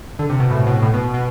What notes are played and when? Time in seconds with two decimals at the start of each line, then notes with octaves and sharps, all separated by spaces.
0.19 D3
0.29 C3
0.40 B2
0.51 A2
0.67 B2
0.82 A2
0.94 B2
1.14 B2